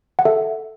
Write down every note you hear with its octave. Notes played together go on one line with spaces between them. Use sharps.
F#5
A4 E5